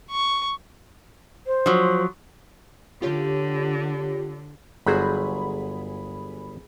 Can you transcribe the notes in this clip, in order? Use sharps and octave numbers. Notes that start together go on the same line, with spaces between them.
C#6
C5
F3 F#3
D3 F4 G4 C#5
G1 F#3 G#4 C5 B5